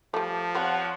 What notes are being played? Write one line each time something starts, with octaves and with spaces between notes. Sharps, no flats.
F3 G3 A3 A5 D6
G3 C4 F4 C#5 F#5